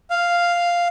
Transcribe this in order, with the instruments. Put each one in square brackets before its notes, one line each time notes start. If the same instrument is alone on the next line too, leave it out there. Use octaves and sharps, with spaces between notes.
[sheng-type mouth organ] F5